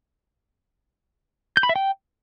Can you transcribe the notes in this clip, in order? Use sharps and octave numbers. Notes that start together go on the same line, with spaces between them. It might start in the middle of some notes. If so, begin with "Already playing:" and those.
G6
B5
E5
G5